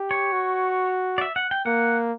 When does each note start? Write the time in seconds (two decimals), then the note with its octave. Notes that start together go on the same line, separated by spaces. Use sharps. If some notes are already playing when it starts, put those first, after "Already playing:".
Already playing: G4
0.11 C#5
0.32 F#4
1.18 D5
1.21 E5
1.36 F#5
1.51 G5
1.66 A#3 F#5